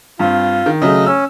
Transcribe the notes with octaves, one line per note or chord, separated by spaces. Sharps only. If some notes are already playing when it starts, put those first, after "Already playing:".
G2 C4 F4
D#3
C#3 F#3 A3 D#5
C#4 E6